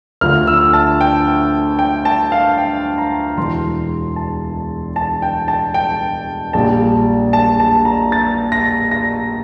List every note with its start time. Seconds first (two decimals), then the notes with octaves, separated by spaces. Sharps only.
0.21 D2 D3 F3 F6
0.47 E6
0.73 A5
1.01 G5
1.79 G5
2.05 A5
2.32 F5
2.58 G5
2.98 A#5
3.37 E1 E2 E3 C6
4.16 A5
4.96 A5
5.22 G5
5.48 A5
5.74 G5
6.53 A#1 A#2 G3 A5
7.33 A5
7.60 A5
7.85 A#5
8.12 A6
8.52 A#6
8.91 A#6